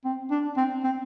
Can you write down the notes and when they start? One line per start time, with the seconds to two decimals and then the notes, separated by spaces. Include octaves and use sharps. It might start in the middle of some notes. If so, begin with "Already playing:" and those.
0.05 C4
0.31 D4
0.57 C4
0.84 C4